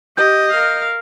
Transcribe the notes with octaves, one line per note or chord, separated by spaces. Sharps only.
G4 D#5 G6
A#4 F5